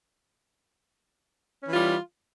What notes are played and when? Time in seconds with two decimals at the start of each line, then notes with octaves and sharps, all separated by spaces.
1.63 C#4
1.67 E3
1.70 F4
1.74 G3